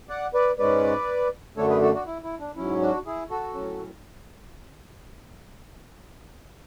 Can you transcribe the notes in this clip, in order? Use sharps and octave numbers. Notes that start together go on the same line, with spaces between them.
D5 F#5
B4 D5
G#2 G#3 C#4 B4 D5
F#2 D3 A3 D4 A4 C#5
G#4 B4
F#4 A4
D4 F#4
E4
E4
D4
G#2 F#3 C#4 E4
D4 F#4
E4 G#4
F#4 A4
A2 F#3 C#4